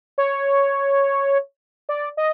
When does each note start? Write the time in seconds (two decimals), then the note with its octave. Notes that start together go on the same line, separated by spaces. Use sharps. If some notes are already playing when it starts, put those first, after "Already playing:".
0.18 C#5
1.89 D5
2.17 D#5